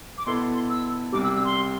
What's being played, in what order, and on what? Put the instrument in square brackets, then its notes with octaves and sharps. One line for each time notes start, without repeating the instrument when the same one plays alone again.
[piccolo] D6
[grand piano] B2 B3 E4 A4 [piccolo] C6
[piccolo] C6
E6
[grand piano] C2 C3 G3 [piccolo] D6
[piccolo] E6
E6
C6